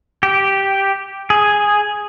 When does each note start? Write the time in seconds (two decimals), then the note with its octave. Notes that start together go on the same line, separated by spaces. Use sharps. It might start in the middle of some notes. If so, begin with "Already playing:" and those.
0.23 G4
1.30 G#4